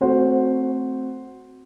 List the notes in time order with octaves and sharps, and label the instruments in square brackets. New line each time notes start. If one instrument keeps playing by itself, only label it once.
[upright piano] A3 C4 F#4 C5